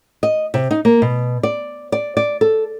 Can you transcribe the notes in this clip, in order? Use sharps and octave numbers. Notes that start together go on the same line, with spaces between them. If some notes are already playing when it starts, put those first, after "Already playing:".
D#5
C3
D#4
A#3
B2
D5
D5
D5
A4